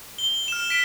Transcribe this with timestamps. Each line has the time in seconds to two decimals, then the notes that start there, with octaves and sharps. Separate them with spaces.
0.18 G7
0.48 F6 E7
0.70 B6 D7